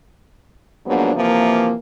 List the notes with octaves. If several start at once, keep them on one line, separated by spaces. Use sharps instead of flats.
G#2 F3 F#3 A#3 B3 D4
C3 E3 F3 A#3